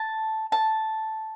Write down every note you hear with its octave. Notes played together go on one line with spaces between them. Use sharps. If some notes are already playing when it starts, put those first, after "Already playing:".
Already playing: A5
A5